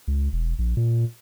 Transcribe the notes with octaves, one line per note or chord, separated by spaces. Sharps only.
C#2
E1
A#1
A#2